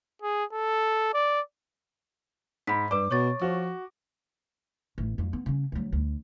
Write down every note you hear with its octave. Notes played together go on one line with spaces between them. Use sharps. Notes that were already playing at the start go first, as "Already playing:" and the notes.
G#4
A4
D5
G#2 B5 B6
G2 B4 D5 D6
B2 C#5 C#6 A6
F3 F#4
A1
F2 F#3
B3
C#3 C#4
D2 F#3
D2